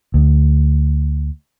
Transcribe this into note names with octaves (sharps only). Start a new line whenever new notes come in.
D2